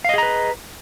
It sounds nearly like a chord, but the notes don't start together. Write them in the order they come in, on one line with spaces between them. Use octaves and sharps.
F5 D#5 G#4 A#5 B4